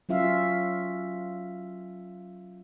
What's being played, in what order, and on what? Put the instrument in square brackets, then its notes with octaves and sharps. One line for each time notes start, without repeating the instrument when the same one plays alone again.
[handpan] F#3 C#4 F4 E5 F5